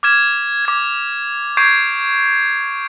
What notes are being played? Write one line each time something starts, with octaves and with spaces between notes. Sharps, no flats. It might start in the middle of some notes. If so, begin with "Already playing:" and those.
D6 F6 G#6 E7
D6 G#6
C#6 D6 G6 G#6 C7 D7